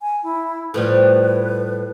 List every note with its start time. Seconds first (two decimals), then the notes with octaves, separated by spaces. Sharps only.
0.01 G#5
0.23 E4
0.74 A2 F3 G3 B4